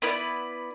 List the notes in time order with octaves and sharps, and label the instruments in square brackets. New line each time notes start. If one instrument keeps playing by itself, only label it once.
[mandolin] B3 E4 B4 D5